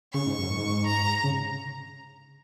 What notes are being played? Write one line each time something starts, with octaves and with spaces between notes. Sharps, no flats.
C#3 C#6
G#2
F#2
G#2
A#5
C#3